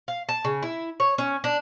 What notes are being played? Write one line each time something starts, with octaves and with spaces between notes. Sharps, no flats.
F5
A5
C#3
E4
C#5
C#4
D4